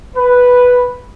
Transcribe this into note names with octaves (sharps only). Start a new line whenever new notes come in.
B4